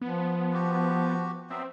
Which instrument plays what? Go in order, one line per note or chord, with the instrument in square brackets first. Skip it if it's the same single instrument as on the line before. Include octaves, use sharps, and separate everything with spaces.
[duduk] F3 [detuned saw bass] B3
[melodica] F#4 G4
[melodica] F#3 B3 E5 [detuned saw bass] C4